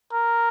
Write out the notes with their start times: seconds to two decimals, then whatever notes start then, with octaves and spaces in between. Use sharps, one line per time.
0.13 A#4